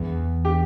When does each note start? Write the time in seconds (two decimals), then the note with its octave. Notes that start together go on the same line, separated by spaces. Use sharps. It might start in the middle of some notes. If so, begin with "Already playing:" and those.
Already playing: E2
0.45 G4